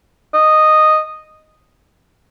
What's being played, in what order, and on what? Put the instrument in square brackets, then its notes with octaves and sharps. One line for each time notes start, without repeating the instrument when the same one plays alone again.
[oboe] D#5